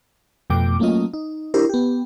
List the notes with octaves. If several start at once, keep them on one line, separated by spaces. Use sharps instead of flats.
F2 B2 A3 G5 D6
F#3 A3 A#3 C#4 F4 D#5
D#4
D4 E4 G4 A#4 C5
B3 G4